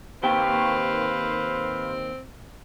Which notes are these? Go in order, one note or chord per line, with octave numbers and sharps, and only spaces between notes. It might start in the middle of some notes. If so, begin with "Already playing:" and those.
D#2 C4 G4 B4 C5 F5 G5